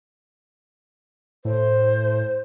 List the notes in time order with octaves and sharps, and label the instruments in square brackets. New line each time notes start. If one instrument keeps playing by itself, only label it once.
[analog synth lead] A2 [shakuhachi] C5